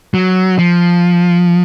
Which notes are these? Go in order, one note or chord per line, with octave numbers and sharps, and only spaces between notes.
F#3
F3